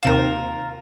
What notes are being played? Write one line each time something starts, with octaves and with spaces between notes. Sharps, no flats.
D#2 C3 F4 A#4 E7